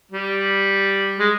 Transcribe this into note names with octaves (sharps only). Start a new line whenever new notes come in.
G3
G#3